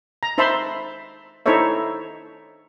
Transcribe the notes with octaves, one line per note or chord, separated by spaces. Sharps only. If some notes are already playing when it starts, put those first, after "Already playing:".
A#5
D#4 C5 E5 A5 B5 C6
D#4 E4 A4 C5 C#5 E5